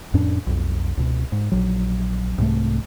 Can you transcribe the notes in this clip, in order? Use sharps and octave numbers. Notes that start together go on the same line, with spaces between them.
F2 A2 C#4 D4
B1 F2
C#2 B2
G#2
A#1 F#3
C2 G#2 C3 A3